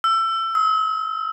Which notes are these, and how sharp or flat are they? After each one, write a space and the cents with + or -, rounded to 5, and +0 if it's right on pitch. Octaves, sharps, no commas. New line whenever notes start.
E6 +25
E6 -45